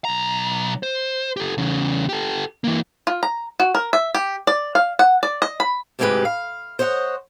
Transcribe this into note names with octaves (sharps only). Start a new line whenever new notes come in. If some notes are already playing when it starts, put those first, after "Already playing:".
B1 A#5
C5
G4 A4
E2 C#3
G4 A4
E3 A#3
F4
A#5
F#4
A#4
E5
G4
D5
F5
F#5
D5
D#5
B5
D2 G#2 C3 G#3 G4 B4
F5
C5 C#5 D#5 F5 F#5